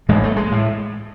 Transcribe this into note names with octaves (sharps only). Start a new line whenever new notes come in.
A1 A2 G#3
A3
G#3
A2